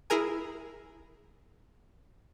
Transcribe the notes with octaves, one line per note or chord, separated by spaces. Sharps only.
E4 G#4 A#4 G#5